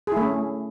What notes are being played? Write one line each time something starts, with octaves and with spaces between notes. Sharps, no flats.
A3 C#4 E4 G#4